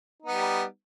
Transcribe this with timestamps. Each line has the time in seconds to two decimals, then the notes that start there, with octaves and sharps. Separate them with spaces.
0.22 D#4
0.26 B3
0.30 G3